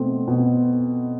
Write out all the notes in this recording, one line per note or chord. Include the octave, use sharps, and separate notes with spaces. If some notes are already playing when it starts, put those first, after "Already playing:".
Already playing: B2 A3 C4
B2